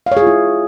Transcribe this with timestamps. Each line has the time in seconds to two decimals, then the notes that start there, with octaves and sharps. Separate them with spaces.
0.06 F5
0.12 C#5
0.17 G#4
0.22 F4
0.27 E4